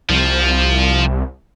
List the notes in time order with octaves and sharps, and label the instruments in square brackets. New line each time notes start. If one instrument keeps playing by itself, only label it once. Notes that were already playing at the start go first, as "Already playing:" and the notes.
[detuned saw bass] C2 [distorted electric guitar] F3